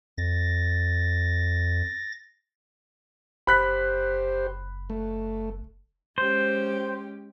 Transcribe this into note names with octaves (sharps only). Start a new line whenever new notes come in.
F2 A6 A#6
F#1 G4 C5 B5 F#6 B6
A3
G#3 C#4 G4 C5